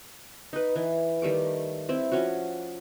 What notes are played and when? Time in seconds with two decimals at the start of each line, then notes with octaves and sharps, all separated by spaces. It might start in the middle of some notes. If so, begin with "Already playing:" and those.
0.53 D#4 B4
0.76 E3
1.22 D#3 G3 A3 D6
1.89 C4 E4
2.12 F3 C#4 F#4